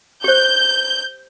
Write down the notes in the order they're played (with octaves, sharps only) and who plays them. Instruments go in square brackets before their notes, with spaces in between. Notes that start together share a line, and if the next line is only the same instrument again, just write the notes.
[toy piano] G4 C5 [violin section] G6